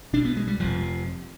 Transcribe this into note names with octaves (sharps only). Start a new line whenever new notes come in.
B1 B2 D4
B3
G#3
G3
F1 F2 C3 F3